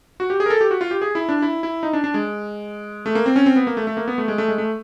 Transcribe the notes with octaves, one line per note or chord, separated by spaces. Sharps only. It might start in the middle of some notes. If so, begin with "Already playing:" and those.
F#4
G4
G#4
A#4
A4
G4
F#4
F4
G4
G#4
E4
D4
E4
E4
D#4
D4
D4
G#3
A3
A#3
C4
C#4
C4
B3
A#3
A3
A3
A#3
B3
A3
G#3
A3
G#3
A3